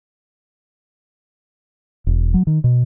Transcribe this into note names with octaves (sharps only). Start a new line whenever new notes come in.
E1
F#3
D#3
B2